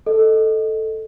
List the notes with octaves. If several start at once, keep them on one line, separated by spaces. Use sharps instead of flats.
A4 D#5